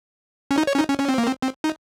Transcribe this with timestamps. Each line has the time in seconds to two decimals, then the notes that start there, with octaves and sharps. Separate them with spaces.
0.51 C#4
0.58 D#4
0.67 C#5
0.75 C#4
0.78 D#4
0.89 C#4
1.00 C#4
1.09 C4
1.18 A#3
1.27 C4
1.43 C4
1.64 D#4